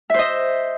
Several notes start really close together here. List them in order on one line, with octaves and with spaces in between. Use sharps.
E5 C5 D#5